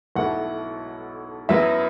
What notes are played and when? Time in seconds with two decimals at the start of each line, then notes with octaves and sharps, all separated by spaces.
0.16 B1 B2 A3 E4 F#5
1.49 F#2 F#3 B3 E4 E5